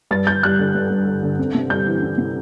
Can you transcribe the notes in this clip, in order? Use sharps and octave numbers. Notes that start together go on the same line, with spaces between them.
G2 A6
G2 G6
G3 F#6
D3
G2
G2
G3
D3
C4
C3
G3 G6
E3
C4
C3